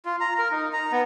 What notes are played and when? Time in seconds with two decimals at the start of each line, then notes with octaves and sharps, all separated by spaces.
0.05 F4
0.20 A#5
0.39 A#4
0.52 D#4
0.73 A#5
0.92 B3